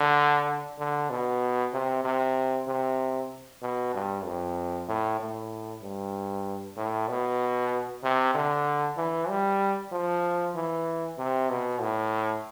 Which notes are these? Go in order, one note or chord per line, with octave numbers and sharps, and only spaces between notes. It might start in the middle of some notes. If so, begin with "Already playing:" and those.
Already playing: D3
D3
B2
C3
C3
C3
B2
G2
F2
A2
A2
G2
A2
B2
C3
D3
E3
G3
F3
E3
C3
B2
A2